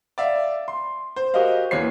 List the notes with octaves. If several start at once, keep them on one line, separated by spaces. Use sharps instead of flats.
D5 E5 F5
C6
C5
F#4 G4 A#4 C5 D#5 F5
D#2 E3 C#5 C7